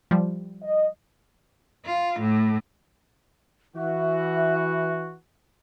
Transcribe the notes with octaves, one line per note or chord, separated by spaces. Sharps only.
F3 G3
D#5
F4
A2
E3 F#4 E5